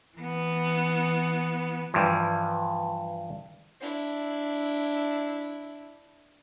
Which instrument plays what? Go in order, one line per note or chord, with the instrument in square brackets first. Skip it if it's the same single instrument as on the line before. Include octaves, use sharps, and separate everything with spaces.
[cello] E3 B3
[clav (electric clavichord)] G2 E3 F3
[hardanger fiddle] D4 E4